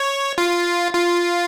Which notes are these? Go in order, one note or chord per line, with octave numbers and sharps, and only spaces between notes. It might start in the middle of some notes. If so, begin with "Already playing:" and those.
Already playing: C#5
F4
F4